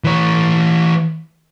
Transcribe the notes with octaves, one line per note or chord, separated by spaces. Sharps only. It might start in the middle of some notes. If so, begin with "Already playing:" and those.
E3 C#5